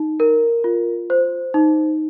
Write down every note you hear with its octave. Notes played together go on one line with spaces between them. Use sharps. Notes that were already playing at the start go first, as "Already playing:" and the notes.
Already playing: D#4
A#4
F4
C5
D#4